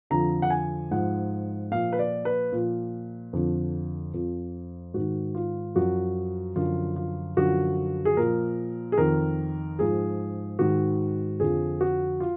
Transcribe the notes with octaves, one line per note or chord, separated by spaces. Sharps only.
F2 D3 F3 A#5
F#5
G#5
G#2 F3 F#5
A#2 F3 F5
B4
D5
B4
A#2 F3
F2 D3 F3
F2 F3
G#2 D#3 F#4
F4
F#2 F3 F#4
F#2 D3 F3 F4
F4
F#2 D3 F3 F#4
G#4
A#2 F3 A#4
G#4
F2 D#3 A#4
G#2 F3 G#4
G#2 D#3 F#4
F2 D3 F3 G#4
F#4
F4